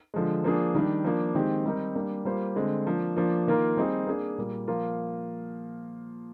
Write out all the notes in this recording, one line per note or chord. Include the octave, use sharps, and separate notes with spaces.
D3 F3 G#3
F3 A#3 D4 G#4
D#3 G3 D4
F3 A#3 D4
D#3 G#3 C4 G4
G3 C4 D#4 A#4
G3 A#3 D4
G3 A#3 F4 C5
D3 G#3 C4
F3 A#3 D4
F3 A#3 D4
D#3 A#3 F4 A#4
G3 C4 D#4 G#4
A#3 D4 G#4
A#2 G3 A#3
F3 A#3 F4 A#4